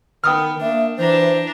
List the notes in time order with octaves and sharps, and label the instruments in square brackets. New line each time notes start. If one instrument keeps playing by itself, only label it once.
[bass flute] D#3 [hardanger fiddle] B3 [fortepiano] G5 D#6 F6
[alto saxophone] A#3 [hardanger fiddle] D4 [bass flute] E5
[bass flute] E3 [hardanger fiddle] D4 A#5 [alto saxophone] C5